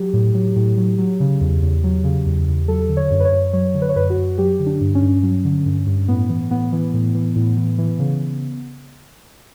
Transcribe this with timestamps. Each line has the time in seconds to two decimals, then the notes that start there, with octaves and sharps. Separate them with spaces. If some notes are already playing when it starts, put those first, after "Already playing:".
Already playing: F#3 G4
0.13 A2
0.34 F#3
0.56 A2
0.77 F#3
0.98 F#3
1.20 C#3
1.41 E2
1.62 E2
1.84 F#3
2.04 C#3
2.26 E2
2.48 E2
2.68 F#3 A4
2.89 D3
2.97 C#5
3.11 F#2
3.20 B4
3.25 C#5
3.32 F#2
3.53 F#3 C#5
3.74 D3
3.82 B4
3.89 C#5
3.95 F#2 B4
4.10 F#4
4.17 F#2
4.38 F#3 G4
4.59 D3
4.66 D4
4.81 G2
4.95 C#4
5.02 G2
5.23 F#3
5.45 D3
5.65 G2
5.87 G2
6.08 A2 B3
6.29 E3
6.51 A2 B3
6.72 E3
6.93 A2
7.15 E3
7.36 A2
7.57 E3
7.78 E3
7.99 C#3